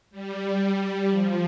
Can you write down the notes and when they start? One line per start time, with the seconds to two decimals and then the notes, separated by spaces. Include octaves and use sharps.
0.11 G3
1.08 F3